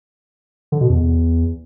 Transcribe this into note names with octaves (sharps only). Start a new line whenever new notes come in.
D3
B2
E2